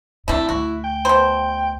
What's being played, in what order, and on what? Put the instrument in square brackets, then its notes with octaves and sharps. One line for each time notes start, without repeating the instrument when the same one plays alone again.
[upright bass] C3 [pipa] A3 D4 [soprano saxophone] E4
[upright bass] D2 [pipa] F#4
[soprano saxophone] G5
[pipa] B2 C5